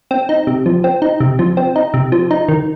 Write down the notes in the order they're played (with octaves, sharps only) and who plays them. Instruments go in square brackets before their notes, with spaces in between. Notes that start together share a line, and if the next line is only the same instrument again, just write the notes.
[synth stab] C4
D#4
C3
F3
C4
D#4
C3
F3
C4
D#4
C3
F3
D#4
D#3